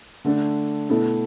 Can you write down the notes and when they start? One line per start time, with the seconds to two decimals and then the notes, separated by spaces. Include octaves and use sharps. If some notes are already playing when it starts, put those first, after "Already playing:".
0.25 D3 A3 D4 A4
0.90 B2 A3 E4 A4